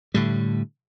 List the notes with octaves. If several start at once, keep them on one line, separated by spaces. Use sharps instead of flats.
A2 D3 G3